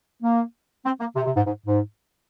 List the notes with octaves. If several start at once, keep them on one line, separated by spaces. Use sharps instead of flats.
A#3
C4
A#3
C3
C3
G#2
G#2
G#2